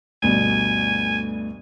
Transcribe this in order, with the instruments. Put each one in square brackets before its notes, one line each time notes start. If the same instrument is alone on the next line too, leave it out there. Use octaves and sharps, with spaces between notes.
[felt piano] D2 G2 B2 [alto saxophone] G#5